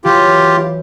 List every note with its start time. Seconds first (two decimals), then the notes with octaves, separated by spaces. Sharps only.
0.05 E3 F#3 F4 G4